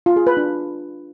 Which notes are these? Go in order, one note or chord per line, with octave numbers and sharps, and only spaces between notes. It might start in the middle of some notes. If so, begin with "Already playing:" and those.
F4
G#4
B4
D4